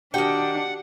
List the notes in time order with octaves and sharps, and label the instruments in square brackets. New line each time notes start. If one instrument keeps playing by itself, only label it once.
[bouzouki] D#3 G5 [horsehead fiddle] D4 [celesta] F#4 G4 A5 [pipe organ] F#5